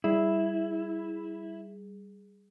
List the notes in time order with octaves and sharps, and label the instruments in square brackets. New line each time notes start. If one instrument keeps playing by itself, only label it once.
[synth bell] G3 G#4 [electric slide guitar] E4